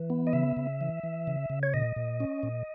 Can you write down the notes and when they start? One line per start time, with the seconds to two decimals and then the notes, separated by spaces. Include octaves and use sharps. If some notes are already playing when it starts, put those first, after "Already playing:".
Already playing: E3
0.10 B3
0.27 D#5
0.33 C#3 E5
0.57 C#3
0.81 E3
1.03 E3
1.27 C#3
1.50 C#3
1.63 C#5
1.74 A#2 D#5
1.96 A#2
2.20 C#4
2.43 A#2